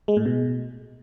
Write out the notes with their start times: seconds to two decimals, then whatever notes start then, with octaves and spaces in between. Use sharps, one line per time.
0.08 G#3
0.17 A2
0.25 B2